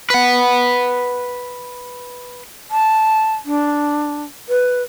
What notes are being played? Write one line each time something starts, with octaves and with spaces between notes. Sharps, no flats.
B4 F#5
A5
D4
B4